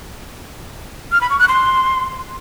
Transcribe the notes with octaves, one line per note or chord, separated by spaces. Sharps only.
F6
B5
C#6
F#6
C6